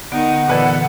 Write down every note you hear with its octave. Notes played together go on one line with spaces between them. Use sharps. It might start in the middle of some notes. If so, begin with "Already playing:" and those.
D3 D#3 B3 D#4 F#5
A#2 D3 E3 B3 F4 A4 B4 D5